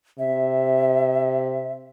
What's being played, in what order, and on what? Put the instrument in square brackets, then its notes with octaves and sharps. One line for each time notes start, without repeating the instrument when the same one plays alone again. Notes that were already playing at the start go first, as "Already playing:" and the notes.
[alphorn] C3 [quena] E5